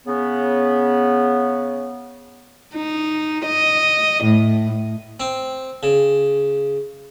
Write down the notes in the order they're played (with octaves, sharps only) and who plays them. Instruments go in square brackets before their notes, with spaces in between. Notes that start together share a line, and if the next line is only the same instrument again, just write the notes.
[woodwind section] C#3 B3
[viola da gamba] D#4
D#5
A2
[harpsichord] C4
C#3